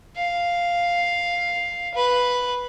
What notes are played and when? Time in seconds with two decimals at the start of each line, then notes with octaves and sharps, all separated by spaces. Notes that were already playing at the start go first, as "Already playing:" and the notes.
0.16 F5
1.95 B4